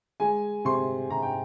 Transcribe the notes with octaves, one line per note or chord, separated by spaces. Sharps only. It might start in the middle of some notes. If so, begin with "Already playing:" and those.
G#3 G#5
C3 C6
C3 A#5
G5